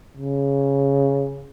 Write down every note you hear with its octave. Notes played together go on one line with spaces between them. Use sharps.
C#3